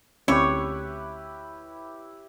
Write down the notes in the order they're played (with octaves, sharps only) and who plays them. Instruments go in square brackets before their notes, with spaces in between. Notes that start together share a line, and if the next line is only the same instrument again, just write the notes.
[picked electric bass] D2 C4 C#4 [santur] E4 G4 B4 [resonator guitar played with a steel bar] C#5